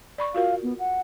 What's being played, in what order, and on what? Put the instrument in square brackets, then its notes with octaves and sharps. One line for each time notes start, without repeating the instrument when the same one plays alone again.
[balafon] D5 B5 C#6
[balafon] F4 F#4 A#4 [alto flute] F5
[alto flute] B3
F#5